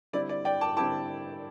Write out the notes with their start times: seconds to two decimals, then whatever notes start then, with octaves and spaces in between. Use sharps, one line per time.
0.13 D3 G3 C4 E4 D5
0.29 D5
0.45 D5 G5
0.61 A5 D6
0.76 D3 G3 C4 E4 A5 D6